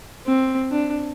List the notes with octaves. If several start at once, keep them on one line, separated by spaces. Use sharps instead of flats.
C4
D4